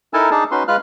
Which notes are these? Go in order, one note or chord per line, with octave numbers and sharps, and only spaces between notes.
D#4 E4 A4 A#4 G#5 A5
D4 D#4 G#4 A5
C#4 D#4 F#4 B4 C6
G#3 F4 B4 F5 F6 F#6